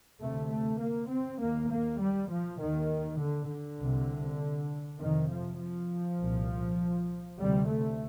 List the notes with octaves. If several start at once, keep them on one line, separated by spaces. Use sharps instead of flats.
D2 C3 A3
A3
A#3
C4
D#2 A#3
A#3
G3
F3
D#2 D#3
D3
D3
C2 C3
F2 C3 D#3
F3
F3
C2 A#2
D2 C3 G3
A3